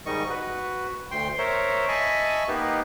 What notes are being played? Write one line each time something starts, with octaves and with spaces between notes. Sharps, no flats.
G#2 D#3 G3 D#5 C#6
F#4 B4
D2 G5 C6
A#4 C5 C#5 E5
D#5 E5 G#5 A5 B5 C#6
A#3 B3 D#4 G4 B4